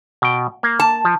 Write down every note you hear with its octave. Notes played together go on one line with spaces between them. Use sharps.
B2 G5
A#3
A5
F3